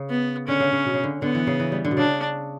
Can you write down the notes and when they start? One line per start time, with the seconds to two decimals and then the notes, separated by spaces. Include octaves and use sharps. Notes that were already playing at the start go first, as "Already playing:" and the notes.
Already playing: C#3
0.10 B3
0.48 D3 C#4
0.60 C#3
0.73 C#3
0.85 B2
0.94 C#3
1.03 D3
1.22 D3 B3
1.35 E3
1.47 C#3
1.60 E3
1.72 G3
1.85 D3
1.91 B2
1.97 C#3 D4